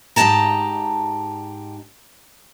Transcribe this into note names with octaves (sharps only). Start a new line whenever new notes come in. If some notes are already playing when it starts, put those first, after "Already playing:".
G#2 G4 D#5 G5 A5 A#5